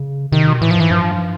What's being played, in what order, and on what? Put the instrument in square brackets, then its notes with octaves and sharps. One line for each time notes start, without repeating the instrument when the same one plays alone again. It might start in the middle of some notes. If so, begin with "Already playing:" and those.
Already playing: [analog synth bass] C#3
[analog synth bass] C3 [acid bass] D#3
[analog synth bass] B2
[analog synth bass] A2 [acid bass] E3
[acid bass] F3
[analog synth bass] G#2 [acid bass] E3
[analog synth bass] G2 [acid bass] F3